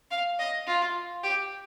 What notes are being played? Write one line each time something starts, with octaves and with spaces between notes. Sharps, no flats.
F5
D#5
F4
G4